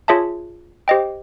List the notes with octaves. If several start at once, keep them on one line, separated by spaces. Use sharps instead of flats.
F4 G#4 C#5 E5 A5
G4 C5 D#5 G5